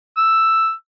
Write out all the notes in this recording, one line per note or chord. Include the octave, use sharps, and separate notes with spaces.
E6